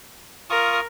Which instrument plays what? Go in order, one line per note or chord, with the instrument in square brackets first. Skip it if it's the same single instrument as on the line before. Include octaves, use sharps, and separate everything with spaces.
[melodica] F4 C#6 D#6 [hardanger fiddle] A#4